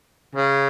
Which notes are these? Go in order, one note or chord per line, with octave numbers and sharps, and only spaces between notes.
C#3